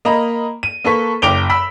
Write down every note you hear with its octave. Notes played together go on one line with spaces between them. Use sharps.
A#3 D#5 A#5 B5
D#7
A#3 A4 B4 C#6 B6
F#1 G5 D6 D7 F7 G7
B5 E6 B6